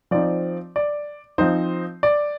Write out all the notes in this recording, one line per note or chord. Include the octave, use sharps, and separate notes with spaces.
F3 C4 D#4 D5
D5
F3 C4 D#4 C5
D5